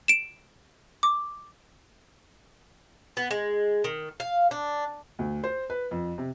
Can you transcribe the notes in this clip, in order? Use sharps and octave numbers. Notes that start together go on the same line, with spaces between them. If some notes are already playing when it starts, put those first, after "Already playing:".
D7 E7
D6
B3
G#3
D#3
F5
D4
D2
C5
B4
F2
C3